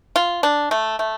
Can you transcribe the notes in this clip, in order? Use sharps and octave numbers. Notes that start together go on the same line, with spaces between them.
F4
D4
A3
A3